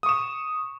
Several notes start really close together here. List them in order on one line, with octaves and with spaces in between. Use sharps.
D#6 C#6 E7